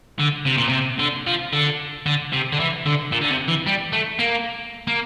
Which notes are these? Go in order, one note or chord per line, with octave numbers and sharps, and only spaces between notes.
D3
C3
A#2
C3
D3
F3
D3
D3
C3
D3
E3
D3
A#2
D3
C3
E3
G3
A3
A#3
A#3